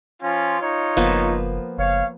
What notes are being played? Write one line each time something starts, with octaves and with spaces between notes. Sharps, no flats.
F3 C#4 F4
D#4 F4 C#5
F#1 F3 A#3 B3
F#1 C#5 F5